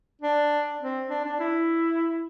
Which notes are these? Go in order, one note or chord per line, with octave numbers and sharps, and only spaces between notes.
D4
C4
D4
D4
E4